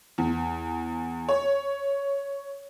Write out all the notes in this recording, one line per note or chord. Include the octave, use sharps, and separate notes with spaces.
E2
C#5